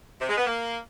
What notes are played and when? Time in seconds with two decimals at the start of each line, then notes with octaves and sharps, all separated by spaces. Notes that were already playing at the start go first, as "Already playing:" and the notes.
0.20 C3
0.29 G#3
0.38 B3
0.47 A#3